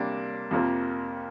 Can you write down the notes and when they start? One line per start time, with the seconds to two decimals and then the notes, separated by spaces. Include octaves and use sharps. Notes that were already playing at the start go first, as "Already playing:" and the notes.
Already playing: C3 G3 A#3 D4
0.51 F2 C3 F3 A#3